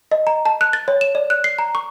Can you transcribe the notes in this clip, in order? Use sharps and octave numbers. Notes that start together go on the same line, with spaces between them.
D#5
A#5
A5
F#6
A6
C#5
E7
D5
F#6
C7
A#5
C#6